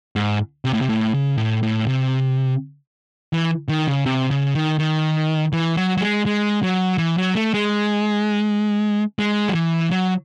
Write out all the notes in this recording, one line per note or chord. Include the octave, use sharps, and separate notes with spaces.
G#2
C3
A2
C3
A2
C#3
A2
A2
C3
E3
D#3
C#3
C3
C#3
D#3
D#3
E3
F#3
F#3
G#3
G#3
F#3
E3
F#3
A3
G#3
G#3
F#3
E3
F#3